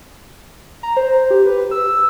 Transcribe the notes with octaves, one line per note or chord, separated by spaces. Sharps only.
A#5
C5
G4
B4
E6